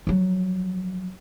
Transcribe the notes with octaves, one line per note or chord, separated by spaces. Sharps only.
F3 F#3